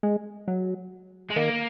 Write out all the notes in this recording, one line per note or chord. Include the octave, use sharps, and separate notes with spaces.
G#3
F#3
G#3
D#3 A#3